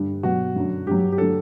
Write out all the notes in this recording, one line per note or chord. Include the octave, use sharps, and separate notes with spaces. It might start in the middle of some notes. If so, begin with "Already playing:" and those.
Already playing: G2 D3 G3
B2 F#3 F#4
F#2 D3 F#3
G2 F#3 G4
G4
D3 F#3 A4